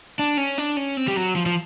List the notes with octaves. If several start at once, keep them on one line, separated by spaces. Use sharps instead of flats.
D4
C#4
D4
C#4
C4
G3
F#3
F3
F3